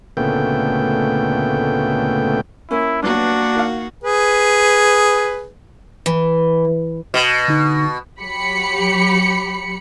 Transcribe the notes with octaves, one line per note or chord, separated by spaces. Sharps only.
D2 A#2 C#3 A3 B3 G5
A#3 C#4 E4
G2 F#3 A#3 B3 D4 F#4
D#3 F5
G#4 B4
E3
B2
D3 D#4
F#3 G4 B5 C#7